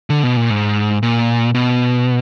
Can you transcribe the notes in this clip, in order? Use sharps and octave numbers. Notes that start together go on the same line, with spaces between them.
D3
B2
A#2
G#2
A#2
B2